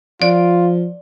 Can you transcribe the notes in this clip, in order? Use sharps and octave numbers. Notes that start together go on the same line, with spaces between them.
F3 F4 D5